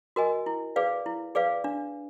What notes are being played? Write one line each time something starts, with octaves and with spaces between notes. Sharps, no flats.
F#4 A#4 D#5 G#5
E4
G#4 B4 D5 F5
E4
G#4 B4 D5 F5
D4